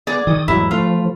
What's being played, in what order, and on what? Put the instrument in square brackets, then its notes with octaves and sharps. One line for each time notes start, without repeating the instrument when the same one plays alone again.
[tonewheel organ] B3 [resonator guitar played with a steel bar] G#4 D5
[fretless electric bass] D#3 [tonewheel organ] D#6
[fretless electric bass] E2 G#2 F#3 [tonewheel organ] G#3 [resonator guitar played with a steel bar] E4
[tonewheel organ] F3 [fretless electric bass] A3 [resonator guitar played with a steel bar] F4